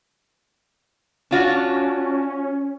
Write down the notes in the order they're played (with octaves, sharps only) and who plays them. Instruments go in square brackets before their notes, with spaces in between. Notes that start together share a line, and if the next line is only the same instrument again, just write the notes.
[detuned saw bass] C#4 [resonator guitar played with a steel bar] D4 F4 F#4